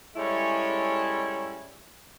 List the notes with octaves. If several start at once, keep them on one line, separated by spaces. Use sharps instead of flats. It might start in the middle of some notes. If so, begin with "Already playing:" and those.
G3 G#3 C#4 E4 A4 C#5